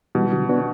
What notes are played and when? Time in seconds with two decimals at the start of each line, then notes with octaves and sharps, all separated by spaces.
0.15 B2 E3 G3
0.32 D3 F#3
0.49 B3 D4 F#4